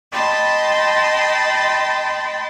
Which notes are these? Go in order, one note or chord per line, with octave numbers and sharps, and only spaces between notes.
D#5 G5 A5 B5 C6